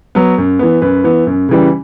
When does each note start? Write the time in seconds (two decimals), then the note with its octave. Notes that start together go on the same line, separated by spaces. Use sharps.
0.15 F#3 B3
0.38 F#2
0.59 E3 B3
0.82 F#2 B4
1.04 E3 B3
1.27 F#2
1.49 C#3 E3 G3